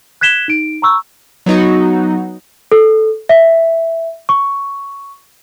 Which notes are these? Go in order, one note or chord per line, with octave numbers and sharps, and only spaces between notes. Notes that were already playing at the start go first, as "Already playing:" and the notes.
F#6 G#6 B6 E7 G7
D#4 D7
A#5 B5 C#6 E6
F#3 B3 D#4 F#4
A4
E5
C#6